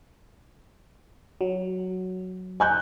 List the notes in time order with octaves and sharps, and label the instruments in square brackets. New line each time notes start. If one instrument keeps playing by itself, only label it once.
[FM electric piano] F#3
[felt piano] G#5 F#6 G6